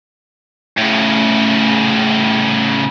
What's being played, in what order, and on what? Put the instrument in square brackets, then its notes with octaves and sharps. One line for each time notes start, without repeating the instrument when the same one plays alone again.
[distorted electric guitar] A2 C#3